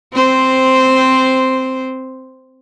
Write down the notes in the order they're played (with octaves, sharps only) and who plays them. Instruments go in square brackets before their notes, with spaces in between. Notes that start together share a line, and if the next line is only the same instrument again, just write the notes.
[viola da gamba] C4 C5